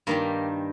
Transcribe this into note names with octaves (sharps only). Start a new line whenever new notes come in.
G2 D#3 G3 A#3